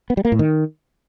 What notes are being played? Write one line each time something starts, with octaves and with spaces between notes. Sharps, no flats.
B3
G3
A#3
A2
D#3